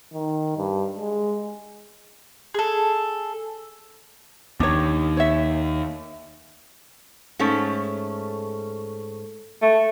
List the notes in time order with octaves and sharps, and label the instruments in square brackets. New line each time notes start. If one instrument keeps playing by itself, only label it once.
[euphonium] D#3
G2
G#3
[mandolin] G#4 A4
[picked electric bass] D#2 [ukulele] D4 C#5
[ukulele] C#5 E5
[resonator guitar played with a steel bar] G#2 A3 C#4
[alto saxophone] A3